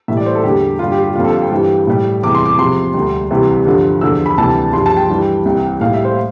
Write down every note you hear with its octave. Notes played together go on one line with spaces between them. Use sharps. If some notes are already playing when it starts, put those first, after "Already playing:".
A2 E3 G3 E5
D5
C5
A4
E2 D3 G3 G4
G2 D3 G3 F4
G4
G4
F2 D3 G3 F4
A4
F5
G5
G2 E3 G3
A2 G3
E2 C3 E3 G3 D6
C6
D6
E2 C3 F3 C6
D2 D3 G3
C2 C3 E3 G3
G2 D3 F3
E2 D3 F3 E6
B5
D2 C3 E3 G3 A5
G2 F3 C6
A5
G5
G2 E3 G3
C2 C3 E3 G3
A2 G3 F5
E5
C5